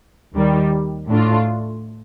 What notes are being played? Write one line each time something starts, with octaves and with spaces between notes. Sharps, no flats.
D#2 D#3 G3
A2 A3 D4 F4